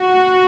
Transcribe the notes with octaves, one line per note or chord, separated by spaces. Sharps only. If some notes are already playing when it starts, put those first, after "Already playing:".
Already playing: F#4